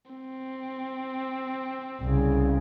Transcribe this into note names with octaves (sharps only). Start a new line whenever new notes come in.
C4
C2 C#3